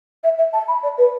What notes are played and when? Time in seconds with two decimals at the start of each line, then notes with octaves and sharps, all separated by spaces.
0.24 E5
0.38 E5
0.53 A5
0.68 B5
0.83 D5
0.98 B4